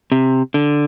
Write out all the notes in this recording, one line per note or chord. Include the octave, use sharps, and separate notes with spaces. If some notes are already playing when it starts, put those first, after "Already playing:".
C3
D3